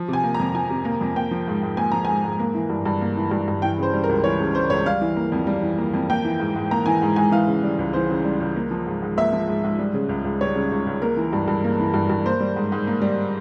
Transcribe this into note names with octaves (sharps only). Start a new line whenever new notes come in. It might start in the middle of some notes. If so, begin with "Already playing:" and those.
Already playing: F3
C3
G#5
A#3
A#5
F2
F3 G#5
C3
A#3
F2
A#3 G5
F3
G#2
G#2
A#3 G#5
F3 A#5
G#2 G#5
G#2
A#3
E3
G2
G2
A#3
E3
G2
G2
E3 G5
C#3 C5
G3
A#4
C#2
E3 C#5
C#3
G3 C5
C#2 C#5
G3 F5
E3
A#3
F2
G3
E3
A#3
F2
A#3 G5
E3
G#2
G#2
A#3 A#5
E3 G#5
G#2
G#2 G#5
E3 F5
C#3
G3
C#2
E3 C5
C#3
G3
C#2
A#3
F3
G#2
G#2
A#3 E5
F3
G#2
G#2
G3
C#3
C#2
C#2
G3 C#5
C#3
C#2
C#2
A#3 A#4
E3
G2
G2
A#3
E3
G2
G2
A#3 C5
G3
G#2
G#2
A#3
G3